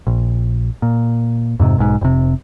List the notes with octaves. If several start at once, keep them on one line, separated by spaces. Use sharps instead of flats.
A#1
A#2
F2 G#2 C3
B1 G#2
F1 C3